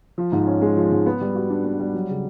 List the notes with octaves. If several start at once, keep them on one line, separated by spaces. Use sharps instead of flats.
F3
G#2
C#4
G#3
F3
G#2
B3
G3
F#4
D4
B3
G3
F#3
C#3